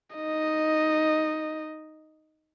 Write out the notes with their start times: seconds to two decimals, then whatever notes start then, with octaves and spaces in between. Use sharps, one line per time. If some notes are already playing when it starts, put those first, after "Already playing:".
0.16 D#4 D#5